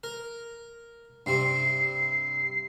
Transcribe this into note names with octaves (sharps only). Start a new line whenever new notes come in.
A#4
G2 C3 C4 C7